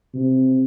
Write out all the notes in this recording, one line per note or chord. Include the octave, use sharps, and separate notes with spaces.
C3